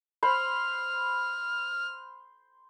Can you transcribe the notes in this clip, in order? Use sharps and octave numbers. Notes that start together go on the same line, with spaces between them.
C5 B5 F6